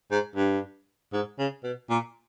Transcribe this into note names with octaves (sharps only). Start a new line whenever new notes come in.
G#2
G2
G#2
C#3
B2
A#2